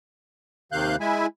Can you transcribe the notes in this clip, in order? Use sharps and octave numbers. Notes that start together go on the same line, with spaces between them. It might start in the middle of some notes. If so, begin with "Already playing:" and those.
D#2 C3 D#3 F5 F#6 G6
G#3 E4 E5 G#5